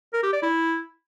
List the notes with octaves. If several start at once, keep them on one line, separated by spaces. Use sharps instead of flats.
A#4
G4
D5
E4